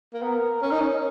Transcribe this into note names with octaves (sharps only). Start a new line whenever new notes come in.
A#3
B3 A#4
C#4 A#4
D#4
C#4